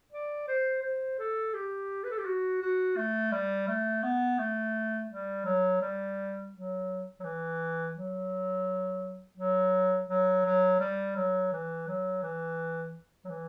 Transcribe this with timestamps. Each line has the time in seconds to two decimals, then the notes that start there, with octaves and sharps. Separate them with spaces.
0.12 D5
0.48 C5
0.82 C5
1.19 A4
1.54 G4
2.04 B4
2.11 A4
2.18 G4
2.25 F#4
2.62 F#4
2.97 A3
3.32 G3
3.68 A3
4.03 B3
4.39 A3
5.10 G3
5.45 F#3
5.81 G3
6.53 F#3
7.20 F#3
7.24 E3
7.96 F#3
9.37 F#3
10.09 F#3
10.45 F#3
10.80 G3
11.16 F#3
11.52 E3
11.88 F#3
12.23 E3
13.25 F#3
13.30 E3